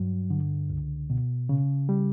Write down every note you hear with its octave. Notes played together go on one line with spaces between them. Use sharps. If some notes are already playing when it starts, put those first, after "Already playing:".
Already playing: G2 F#3
D3
C#2
B2
C#3
G3